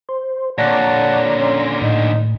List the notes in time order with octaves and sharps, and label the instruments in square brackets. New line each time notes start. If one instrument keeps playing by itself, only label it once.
[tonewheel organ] C5
[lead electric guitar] A#2 D3 [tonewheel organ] C#5 D5 A#5 [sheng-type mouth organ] F#5 A5
[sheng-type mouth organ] C#4 C6
[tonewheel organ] A2 [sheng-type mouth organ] D#4